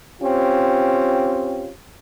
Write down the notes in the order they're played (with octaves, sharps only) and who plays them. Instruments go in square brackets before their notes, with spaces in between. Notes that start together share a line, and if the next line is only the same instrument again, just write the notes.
[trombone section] C4 C#4 F4 G4